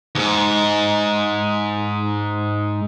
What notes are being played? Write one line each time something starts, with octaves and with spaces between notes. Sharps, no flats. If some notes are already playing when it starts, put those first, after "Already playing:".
D#2 G#2